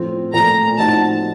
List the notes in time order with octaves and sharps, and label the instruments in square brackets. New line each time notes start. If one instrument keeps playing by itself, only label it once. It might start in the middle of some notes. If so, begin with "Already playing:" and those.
Already playing: [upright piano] A2 F3 C4 F4
[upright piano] A#2 F3 A3 [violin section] A#5
[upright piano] A2 F3 C4 D#4 F#4 [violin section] A5